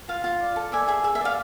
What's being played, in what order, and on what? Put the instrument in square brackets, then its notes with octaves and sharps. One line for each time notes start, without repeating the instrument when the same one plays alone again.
[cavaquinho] F4 F5
F4
D5
A4
D5 E5 G#5
G#4 E5
G#4 E5
E5
D5 F5